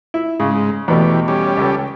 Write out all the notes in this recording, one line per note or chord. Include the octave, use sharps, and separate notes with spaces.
E4
G#2 C#3 G#3
E2 B2 E3 A3 G4
G3 C#4 G4
C#2 A4